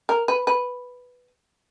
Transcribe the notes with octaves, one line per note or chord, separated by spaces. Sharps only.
A#4
B4
B4